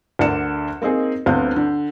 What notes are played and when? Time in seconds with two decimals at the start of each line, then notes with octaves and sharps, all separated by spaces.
0.19 D2 D3 A#4 D5 C#7 E7
0.82 A#3 C4 D#4 G#4
1.26 G1 D2 B3 C4 F5 G6
1.56 D3